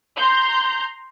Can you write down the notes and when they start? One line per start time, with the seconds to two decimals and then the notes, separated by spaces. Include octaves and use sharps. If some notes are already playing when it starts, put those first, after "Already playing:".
0.17 A#5 C6 G6